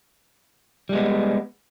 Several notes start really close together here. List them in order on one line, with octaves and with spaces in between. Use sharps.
G3 G#3 B3